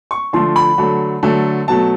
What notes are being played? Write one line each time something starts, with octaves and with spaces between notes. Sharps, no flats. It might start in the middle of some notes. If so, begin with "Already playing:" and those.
C#6
D3 F3 A3 C6
B5
D3 F#3 A3
D3 F#3 A3
B2 F#3 A3 A5